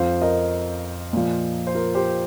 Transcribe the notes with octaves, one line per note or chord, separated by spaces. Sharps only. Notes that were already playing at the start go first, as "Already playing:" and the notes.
Already playing: F2 F3 C5 F5
A#4 D#5
A#2 F3
C5
F4 A#4
G4 C5